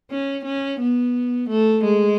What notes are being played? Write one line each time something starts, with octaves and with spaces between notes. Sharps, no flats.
C#4
C#4
B3
A3
G#3